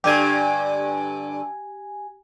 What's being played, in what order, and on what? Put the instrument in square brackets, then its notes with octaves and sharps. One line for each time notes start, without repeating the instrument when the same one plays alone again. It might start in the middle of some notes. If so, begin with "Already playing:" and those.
[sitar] G2 D3 [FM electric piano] G4 G#5